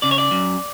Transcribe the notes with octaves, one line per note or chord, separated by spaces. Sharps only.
C#3 D5
C#5
D5
F#2